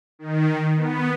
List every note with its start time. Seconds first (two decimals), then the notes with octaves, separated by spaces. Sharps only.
0.19 D#3
0.76 B3